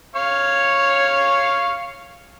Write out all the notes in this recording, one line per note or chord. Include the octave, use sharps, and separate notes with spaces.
C#5 F5 C#6